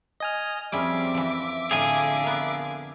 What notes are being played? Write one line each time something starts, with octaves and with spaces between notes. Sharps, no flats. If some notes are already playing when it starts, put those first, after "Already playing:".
D#5 G#5 F6
F2 G3 C4 C#4 G#4 E5 D6
E3 F3
F2 A2 D3 F3 G#4 F5 G#5
B3 A#4